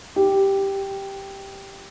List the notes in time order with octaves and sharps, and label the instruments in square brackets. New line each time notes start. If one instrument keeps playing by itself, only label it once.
[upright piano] G4